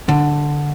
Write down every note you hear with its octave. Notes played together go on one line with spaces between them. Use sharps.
D3